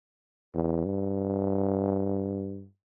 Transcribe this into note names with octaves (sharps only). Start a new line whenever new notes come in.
E2
G2